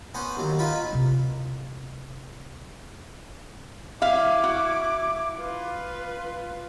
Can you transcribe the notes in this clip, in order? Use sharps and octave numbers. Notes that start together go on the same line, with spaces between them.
B3 C#4 C5 F#5
D#2 F#3
D#4 F4 B4 B5
C3 E4
E4 E5 F5 D6
F#4
F4 B4